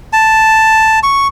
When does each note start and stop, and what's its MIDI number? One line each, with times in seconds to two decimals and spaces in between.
0.13 0.99 81
1.03 1.28 85